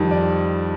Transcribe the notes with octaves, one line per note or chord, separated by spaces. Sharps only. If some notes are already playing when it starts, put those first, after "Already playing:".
Already playing: F2 D#3 G3
D5